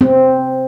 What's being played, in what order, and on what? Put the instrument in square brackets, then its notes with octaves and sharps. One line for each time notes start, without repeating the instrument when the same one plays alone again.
[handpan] C4